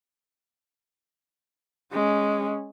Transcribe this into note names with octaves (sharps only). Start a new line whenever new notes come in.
G#3 C#4